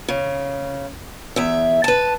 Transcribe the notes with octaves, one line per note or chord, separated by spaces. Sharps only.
C#3
E2 E5
B4 A5